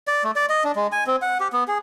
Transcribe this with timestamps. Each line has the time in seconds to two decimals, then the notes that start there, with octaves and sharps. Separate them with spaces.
0.08 D5
0.24 A3
0.36 D5
0.49 D#5
0.64 D4
0.76 G#3
0.92 G#5
1.07 C4
1.22 F#5
1.40 G4
1.53 B3
1.68 G#4